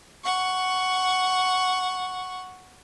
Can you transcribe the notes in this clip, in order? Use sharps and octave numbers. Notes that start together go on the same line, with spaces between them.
F#5 C#6